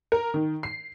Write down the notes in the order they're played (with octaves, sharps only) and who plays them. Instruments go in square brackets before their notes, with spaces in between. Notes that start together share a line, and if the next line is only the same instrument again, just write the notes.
[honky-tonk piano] A#4
D#3
C7